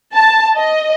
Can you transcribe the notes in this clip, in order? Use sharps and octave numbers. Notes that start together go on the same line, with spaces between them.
A5
D#5